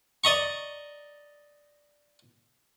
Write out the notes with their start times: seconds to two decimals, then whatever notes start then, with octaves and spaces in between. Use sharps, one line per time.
0.24 D5 D#5 A#5 C#6